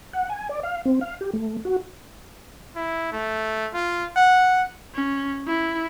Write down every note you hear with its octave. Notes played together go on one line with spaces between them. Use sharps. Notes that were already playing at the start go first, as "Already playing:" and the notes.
F#5
G#5
D5
F5
C4
F5
G4
A3
F#4
E4
A3
F4
F#5
C#4
E4